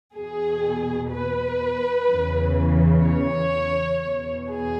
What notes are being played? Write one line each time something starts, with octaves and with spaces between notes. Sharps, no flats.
E2 B2 G#4
B4
E2 C#3 E3
C#5
E2 B2
G#4